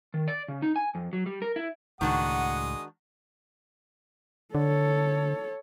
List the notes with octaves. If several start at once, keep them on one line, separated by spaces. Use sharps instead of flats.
D#3
D5
C#3
D#4
G#5
F2
F#3
G3
A#4
E4
C#2 A2 D#3 G#3 D4 F#4 F#5 D#6
D3 A4 C#5